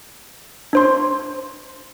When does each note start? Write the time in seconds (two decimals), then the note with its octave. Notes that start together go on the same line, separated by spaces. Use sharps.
0.73 D4 C5 C6